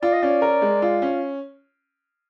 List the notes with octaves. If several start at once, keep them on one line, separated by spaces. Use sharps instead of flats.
F4 D5
D#5
C#4 D5
A#4
G#3
F4
C#4